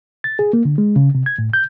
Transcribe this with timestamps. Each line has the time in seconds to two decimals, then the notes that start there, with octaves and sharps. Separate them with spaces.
0.24 A6
0.39 G#4
0.53 A#3
0.65 D3
0.78 G#3
0.96 C#3
1.15 C3
1.26 G#6
1.39 A2
1.53 G6